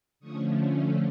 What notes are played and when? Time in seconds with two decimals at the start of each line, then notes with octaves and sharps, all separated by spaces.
0.20 D3 F3 A3 C#4 C#6 D#6